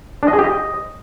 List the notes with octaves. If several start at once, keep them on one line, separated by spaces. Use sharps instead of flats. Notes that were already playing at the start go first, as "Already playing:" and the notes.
D4
D#5
G#4
G4
D#5